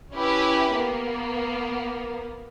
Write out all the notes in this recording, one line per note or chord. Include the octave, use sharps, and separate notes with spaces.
C#4 E4 G4 B4
A#3 B3